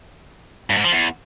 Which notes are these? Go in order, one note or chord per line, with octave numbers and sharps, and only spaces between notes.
G2
G#2
F3
E2